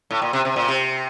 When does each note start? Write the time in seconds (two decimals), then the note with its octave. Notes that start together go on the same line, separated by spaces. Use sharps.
0.11 A2
0.22 A#2
0.33 C3
0.45 C3
0.56 A#2
0.68 C3